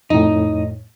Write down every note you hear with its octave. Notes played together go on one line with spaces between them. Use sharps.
F2 A2 D#4